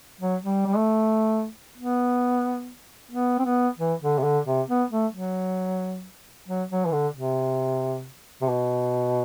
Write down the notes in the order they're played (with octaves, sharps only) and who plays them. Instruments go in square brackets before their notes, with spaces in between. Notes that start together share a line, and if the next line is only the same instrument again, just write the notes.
[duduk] F#3
G3
G3
A3
B3
B3
C4
B3
E3
D3
C3
D3
C3
B3
A3
F#3
F#3
F#3
E3
D3
C3
C3
B2